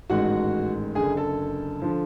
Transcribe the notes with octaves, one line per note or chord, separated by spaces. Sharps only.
A1 G#2 D#3 G#3 F#4 F#5
F#1 F#2 D3 G#4 G#5
A4 A5
D3 F3